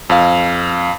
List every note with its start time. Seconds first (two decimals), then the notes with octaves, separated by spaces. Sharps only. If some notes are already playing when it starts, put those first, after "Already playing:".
0.10 F2 F5